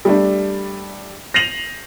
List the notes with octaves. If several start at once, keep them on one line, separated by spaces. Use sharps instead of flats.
G3 A3 D4
A#6 C7 D#7 F7 F#7